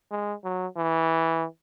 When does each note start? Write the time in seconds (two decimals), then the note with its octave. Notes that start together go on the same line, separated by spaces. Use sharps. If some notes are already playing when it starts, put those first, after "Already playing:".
0.11 G#3
0.44 F#3
0.77 E3